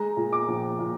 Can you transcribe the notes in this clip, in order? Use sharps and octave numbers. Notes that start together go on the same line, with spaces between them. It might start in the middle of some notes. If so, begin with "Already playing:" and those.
Already playing: G#3 A#5
A#2
D6
A#1
A#2